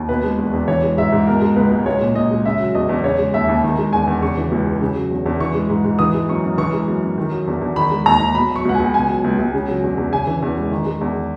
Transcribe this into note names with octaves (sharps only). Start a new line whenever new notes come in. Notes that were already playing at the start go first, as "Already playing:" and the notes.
Already playing: D#2
B2 B4
G#3
E2
E2
E3 C#5
G#3
G#2 E5
G#2
B2 A#4
G#3
C#2 B4
C#2
G#3 C#5
A#2
A#2 D#5
G#3
C#3 E5
F#3
E2 D#5
E2
C#3 C#5
G#3
D#2 E5
D#2
D#3
G#3
E2 G#5
E2
C#3 C#6
E3
C#2
G#3
C#3
F#3
E2
E2
E3 C#6
G#3
G#2
G#2
E3 D#6
G#3
F#2 C#6
F#2
E3 C#6
G#3
F#2
F#2
D#3
F#3
E2
E2
D#3 B5
G#3
D#2 A#5
D#2
B2 B5
F#3
C#6
C#2 F#5
G#5
C#2
B2 G#5
F#3
C#2
C#2
C#3
F#3
E2
E2
C#3 G#5
E3
E2
G#3
D#3
G#3
E2